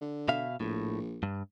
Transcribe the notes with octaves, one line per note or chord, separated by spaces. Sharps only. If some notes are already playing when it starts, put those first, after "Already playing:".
D3
B2 E5 F5
A#1 A2
G2